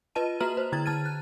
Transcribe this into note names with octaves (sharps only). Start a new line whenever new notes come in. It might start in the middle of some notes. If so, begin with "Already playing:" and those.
F4 B4 D#5 A5 D#7
A#3 F#4 B4 A#5 F6 F#7
C5
D3 E4 A#5 G#6 A6
D3 A5 F6 A6 D#7
F#6